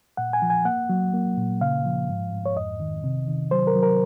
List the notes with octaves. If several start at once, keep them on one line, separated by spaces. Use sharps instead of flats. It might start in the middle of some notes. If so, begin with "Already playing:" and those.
A#2 F#5
G#5
F3
G#5
A#3 F#5
F#3
A#3
A#2
C#3 F5
F3
G#2
G#2
C#5
F2 D#5
D#3
C3
D#3
F#3 C5
A#4
F#3
A#4